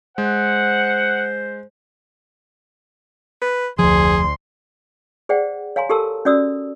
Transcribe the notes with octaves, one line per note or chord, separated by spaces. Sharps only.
G#3 C5 F#5
B4
F1 D2 F3 G#4 C6
G#4 C5 D5 F#5 G5
C#5 F5 G#5 A#5 C6
G4 A4 A#4 A5 C6 E6
C#4 F#4 D5 D#6 E6